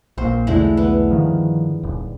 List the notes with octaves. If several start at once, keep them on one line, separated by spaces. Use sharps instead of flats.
A#1 A#2 C5
B1 E2 D3 G#3 A3 E4
B3
G2 D#3 F3
D#1